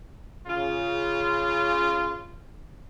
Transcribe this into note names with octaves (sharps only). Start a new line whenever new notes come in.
C#3 F4